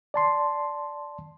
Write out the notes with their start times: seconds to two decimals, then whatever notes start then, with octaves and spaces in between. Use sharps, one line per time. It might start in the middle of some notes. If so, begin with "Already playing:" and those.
0.14 D5 A5 C6